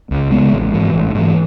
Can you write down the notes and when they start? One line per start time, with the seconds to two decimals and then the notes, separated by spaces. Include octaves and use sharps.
0.11 C#2
0.31 C#3 G#3 B3
0.52 A1
0.73 G#2 E3
0.94 A1
1.15 G#2 E3